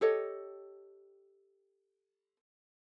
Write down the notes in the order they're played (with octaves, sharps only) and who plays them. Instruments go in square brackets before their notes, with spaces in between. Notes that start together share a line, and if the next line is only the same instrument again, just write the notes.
[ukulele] G4 A4 C#5 D#5